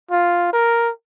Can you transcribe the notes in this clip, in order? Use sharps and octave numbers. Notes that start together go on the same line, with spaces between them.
F4
A#4